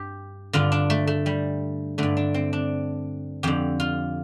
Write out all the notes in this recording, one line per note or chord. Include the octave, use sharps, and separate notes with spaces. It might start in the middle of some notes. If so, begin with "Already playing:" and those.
Already playing: G2 G4
G2 D3 F4
D4
A3
A3
G3
G2 D3 A3
D4
C4
D4
F2 D3 G4
F4